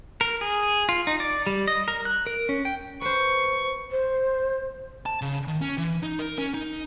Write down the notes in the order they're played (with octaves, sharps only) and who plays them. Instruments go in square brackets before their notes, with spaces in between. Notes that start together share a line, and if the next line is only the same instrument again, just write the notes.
[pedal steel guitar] A#4
G#4
F4
D#4
D5
G3
D#5
A#4
F#6
A#4
C#4
G5
[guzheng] B4 C5 [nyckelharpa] C#6
[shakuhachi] C5
[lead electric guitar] A5
C#3
D#3
C#4
E3
D#4
A#4
C#4
D#4